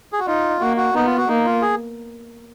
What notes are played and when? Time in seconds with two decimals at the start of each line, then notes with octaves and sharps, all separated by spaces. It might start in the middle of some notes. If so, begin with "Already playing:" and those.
0.13 G#4
0.19 F#4
0.27 D#4 F4
0.60 A#3 F#4
0.77 F#4
0.94 B3 D#4
1.05 F4
1.17 F#4
1.28 A#3 D#4
1.45 F4
1.62 G#4